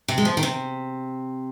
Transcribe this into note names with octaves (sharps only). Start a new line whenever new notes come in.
C3
G#3
F3
D#3
C3